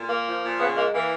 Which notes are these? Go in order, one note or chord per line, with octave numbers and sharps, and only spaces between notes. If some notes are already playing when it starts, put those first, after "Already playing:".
Already playing: A#2
A#3
F3
A#2
C#3 B3
G#3 A#3
E3 A#3